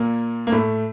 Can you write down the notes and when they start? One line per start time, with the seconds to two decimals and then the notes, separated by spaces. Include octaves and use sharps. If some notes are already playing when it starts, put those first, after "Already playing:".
Already playing: A#2 A#3
0.47 A#3
0.52 A2 A3